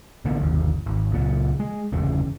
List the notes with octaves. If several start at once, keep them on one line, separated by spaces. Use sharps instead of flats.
A1 D3 A#3 B3
G1 D#2
G#1
C#2 A#2
G#3
G1 E2 C#3